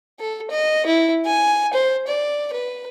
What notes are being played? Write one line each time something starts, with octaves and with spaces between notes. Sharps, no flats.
A4
D#5
E4
G#5
C5
D5
B4